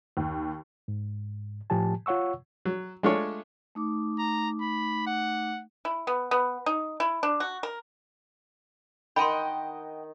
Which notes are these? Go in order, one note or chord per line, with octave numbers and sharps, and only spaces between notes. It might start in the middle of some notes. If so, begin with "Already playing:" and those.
D#2
G#2
A2 F3 G4 G#5 A5
F4 C#5 F#5 C#6 E6
F#3
G#3 A3 D4 F4 A4 C#5
A3 D#4 D6
A#5
B5
F#5
E4
B3
B3
D#4
E4
D4
F#4
A#4
D#3 D#5 F#5 G5 B5 C6